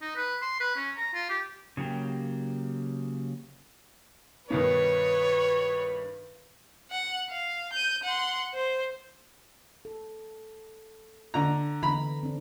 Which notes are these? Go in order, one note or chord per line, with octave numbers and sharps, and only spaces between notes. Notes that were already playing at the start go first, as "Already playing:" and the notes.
D#4
B4
C6
B4
C#4
A#5
F4
G4
C#3 F#3 A#3 G4
G2 B2 D#3 B4 C#5
F#5
F5
G6 D#7
F#5 C6
C5
A4
D3 A#5
D3 E3 B3 A#5 B5
C4 D4